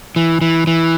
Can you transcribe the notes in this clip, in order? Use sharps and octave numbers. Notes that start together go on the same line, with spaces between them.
E3
E3
E3